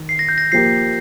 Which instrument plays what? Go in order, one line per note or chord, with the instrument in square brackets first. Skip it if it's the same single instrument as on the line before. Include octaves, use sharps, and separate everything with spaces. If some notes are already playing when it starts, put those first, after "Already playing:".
Already playing: [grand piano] D#3
[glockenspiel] C7
A#6
G6
A#6
[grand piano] F3 A#3 G4 [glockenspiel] C7